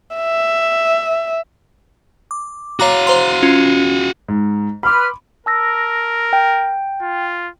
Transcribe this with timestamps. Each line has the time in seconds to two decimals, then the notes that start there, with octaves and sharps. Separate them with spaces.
0.16 E5
2.31 D6
2.80 F#4 C#5 F5 A#5 D6
3.07 C5 A#5 C6
3.42 C#4 F4
4.28 G#2
4.83 B4 B5 C6 D6 F6
5.46 A#4 A5 E6 A#6
6.33 G5
7.01 F4